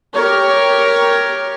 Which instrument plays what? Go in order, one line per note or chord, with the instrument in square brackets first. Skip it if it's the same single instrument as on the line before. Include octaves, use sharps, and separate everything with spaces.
[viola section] G4 A#4 C#5